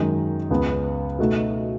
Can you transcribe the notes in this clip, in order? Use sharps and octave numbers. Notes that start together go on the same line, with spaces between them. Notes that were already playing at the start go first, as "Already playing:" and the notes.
Already playing: F#2 D#3 G#3 D#4
C#2 C#3 G#3 B3
B2 A3 D#4 F#4